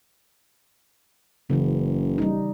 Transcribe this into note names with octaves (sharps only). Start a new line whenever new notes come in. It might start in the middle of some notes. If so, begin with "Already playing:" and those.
F#1 C#3 E3
G3 D#4